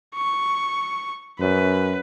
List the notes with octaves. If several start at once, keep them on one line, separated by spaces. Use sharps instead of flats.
C#6
F#2 B4